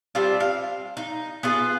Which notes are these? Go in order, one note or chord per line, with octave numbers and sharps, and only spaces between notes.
G3 C4 D4 F4
F5
D#4
B3 F4 G#4